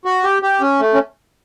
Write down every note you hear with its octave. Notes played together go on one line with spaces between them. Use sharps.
F#4
G4
G4
C#4
A3
C#4